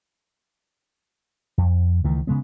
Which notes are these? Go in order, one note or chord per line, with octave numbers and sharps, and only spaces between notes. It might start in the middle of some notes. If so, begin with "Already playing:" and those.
F2
C#2 D#3 E3 A3
C#3 G#3 B3